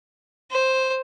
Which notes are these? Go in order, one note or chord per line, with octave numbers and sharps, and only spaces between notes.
C5